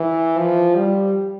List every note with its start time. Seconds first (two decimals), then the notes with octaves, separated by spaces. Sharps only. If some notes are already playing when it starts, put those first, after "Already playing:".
Already playing: E3
0.39 F3
0.75 G3